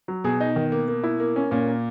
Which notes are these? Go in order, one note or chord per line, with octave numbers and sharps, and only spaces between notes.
F#3
B2 G#4
D#4
D#3
A#3
A#3
E4
A#3
C#4
A#2 C#4
A#3